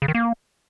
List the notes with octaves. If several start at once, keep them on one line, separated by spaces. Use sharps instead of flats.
C#3
D#3
A#3